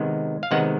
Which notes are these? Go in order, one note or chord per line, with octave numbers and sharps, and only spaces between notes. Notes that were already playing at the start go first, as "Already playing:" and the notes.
Already playing: C3 D#3 G#3 B3
F5
C3 D#3 G#3 B3 F#5